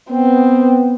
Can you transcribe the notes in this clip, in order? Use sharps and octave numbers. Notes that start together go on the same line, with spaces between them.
B3 C4